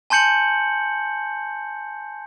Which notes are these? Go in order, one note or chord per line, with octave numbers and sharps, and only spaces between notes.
G#5 A5 C6 G6 C#7 F#7